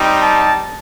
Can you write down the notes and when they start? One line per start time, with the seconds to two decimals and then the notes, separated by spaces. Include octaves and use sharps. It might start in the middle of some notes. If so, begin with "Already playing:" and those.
Already playing: G3 C4 D#4
0.21 A5